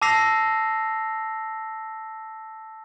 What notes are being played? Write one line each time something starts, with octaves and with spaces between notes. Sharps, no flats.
A5 D6 E6 A#6 C7 F7